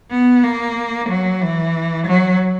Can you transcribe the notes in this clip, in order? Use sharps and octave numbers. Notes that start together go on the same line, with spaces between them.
B3
A#3
F#3
E3
F#3